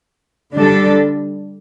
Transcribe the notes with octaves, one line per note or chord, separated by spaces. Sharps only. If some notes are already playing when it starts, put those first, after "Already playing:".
D3 G3 D4 A4